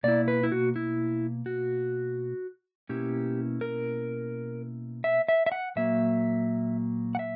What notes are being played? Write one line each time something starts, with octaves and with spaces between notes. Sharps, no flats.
B2 A#3 E4 D5
B4
E4
F#4
E4
F#4
B2 A#3 C#4 E4 G4
A#4
E5
E5
E5
F#5
A#2 F#3 A#3 E5
F#5
E5